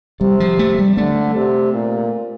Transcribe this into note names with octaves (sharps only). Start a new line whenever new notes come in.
C3 G3
F3
A3
G3
D3 A3
C3
A#2